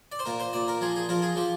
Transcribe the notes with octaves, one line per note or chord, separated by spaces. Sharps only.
D5
C5
A#2 A#4
C5
A#2 D5
A#4
F3 G#4
G#4
F3 A#4
G#4
F3 G4